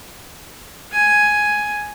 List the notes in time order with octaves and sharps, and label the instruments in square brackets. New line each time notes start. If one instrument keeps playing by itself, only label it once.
[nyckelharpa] G#5